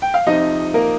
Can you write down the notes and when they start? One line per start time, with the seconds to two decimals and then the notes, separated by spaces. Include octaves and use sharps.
0.02 G5
0.14 F5
0.27 F2 C3 F3 D#4 D#5
0.74 A#3 A#4